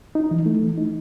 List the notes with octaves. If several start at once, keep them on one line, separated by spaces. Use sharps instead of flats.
D#4
E3
A3
E3
D#4